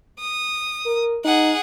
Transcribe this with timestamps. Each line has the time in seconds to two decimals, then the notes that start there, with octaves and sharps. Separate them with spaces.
0.19 D#6
0.86 A#4
1.25 D#4 G#4 F#5